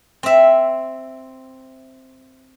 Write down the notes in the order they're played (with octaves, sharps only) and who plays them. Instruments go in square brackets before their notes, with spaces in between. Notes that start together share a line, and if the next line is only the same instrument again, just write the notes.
[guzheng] C4 E5